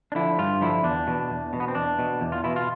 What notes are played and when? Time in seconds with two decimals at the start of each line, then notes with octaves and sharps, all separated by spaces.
0.12 D4
0.15 D3 F3 E4
0.38 G2 F4
0.61 D3 F3 E4
0.83 E2 D4
1.07 B2
1.30 E2
1.53 B2
1.60 B3
1.68 C4
1.75 E2 D4
1.99 B2
2.21 E2
2.32 F4
2.44 B2 E4
2.56 F4